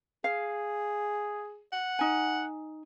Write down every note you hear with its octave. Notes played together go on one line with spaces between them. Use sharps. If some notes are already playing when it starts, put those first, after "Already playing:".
G#4 F5
F#5
D#4 G#5